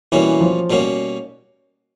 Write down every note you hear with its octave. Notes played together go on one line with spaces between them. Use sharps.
B2 E3 G3 A#3 C#4 F#4
F3
B2 G3 A#3 C#4 F#4